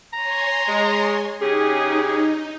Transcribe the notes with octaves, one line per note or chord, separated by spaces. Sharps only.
C#5 G#5 A#5 C6
G#3
C#3 C#4 D#4 G4 G#4